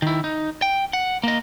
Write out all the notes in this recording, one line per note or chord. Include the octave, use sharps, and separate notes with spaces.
D#3 E4
D#4
G5
F#5
A#3 D#5